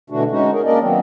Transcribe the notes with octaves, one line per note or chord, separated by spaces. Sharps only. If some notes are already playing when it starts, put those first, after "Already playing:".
B2 D3 E3 A3 D4 F#4
G#3 C#4 D#4 F#4
G#4 A#4
A#3 C#4 D4 A#4 D5 D#5
D#3 F#3 B3 C4